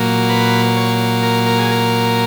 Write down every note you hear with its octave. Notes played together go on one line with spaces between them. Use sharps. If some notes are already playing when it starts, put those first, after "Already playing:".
Already playing: A#2 F#3 A#3
B4
C#5
A#4
A#4
G#4
A#4